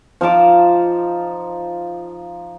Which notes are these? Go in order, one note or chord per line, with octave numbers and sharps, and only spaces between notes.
F3 D#4 A5 D6